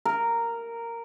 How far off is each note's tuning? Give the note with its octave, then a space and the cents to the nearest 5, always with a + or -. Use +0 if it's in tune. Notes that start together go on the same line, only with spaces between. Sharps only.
A#4 -10